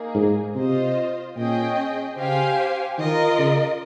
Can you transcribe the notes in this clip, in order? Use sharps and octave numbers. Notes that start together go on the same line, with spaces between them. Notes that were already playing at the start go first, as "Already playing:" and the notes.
Already playing: A#3 D#4 G#4
G#2
C3 F4 C5 D#5
A#2 C#4 G#4 D#5 G5
C#3 G4 C5 F5 G#5
D#3 F4 A#4 D#5
C#3